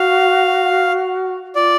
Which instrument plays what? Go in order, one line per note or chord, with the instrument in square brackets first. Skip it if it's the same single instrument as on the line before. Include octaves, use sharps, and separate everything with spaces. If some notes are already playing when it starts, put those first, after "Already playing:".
Already playing: [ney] F#4 [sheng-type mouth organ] F5
[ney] F4 [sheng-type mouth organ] D5